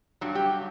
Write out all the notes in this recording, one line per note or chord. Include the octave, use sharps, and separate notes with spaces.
G2 F#3
G4